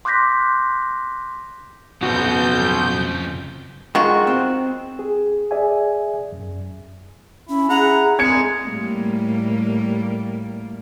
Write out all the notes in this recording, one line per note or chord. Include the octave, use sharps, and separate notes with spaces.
C6 D6 F#6 G6 A#6 B6
B1 F2 C#3 F#4 G6
D#3 G#3 F4 F#4
C4
G#4
G#4 D5 E5 G#5
F#2
C#4 E4
G#4 F#5 A#5
G#3 C4 G#4 G#6 C#7
A2 G3 A#3